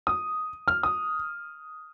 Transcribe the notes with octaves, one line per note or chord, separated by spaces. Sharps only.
D#6
F6
D#6